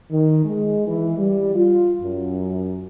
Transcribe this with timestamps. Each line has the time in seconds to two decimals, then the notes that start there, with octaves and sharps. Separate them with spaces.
0.10 D#3
0.43 G#3
0.87 E3
1.17 G3
1.55 F4
2.02 F#2